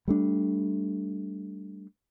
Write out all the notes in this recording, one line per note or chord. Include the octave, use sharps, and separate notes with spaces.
G3 A3 D4